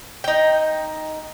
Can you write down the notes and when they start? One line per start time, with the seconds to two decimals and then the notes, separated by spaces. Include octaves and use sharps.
0.24 D#4 G5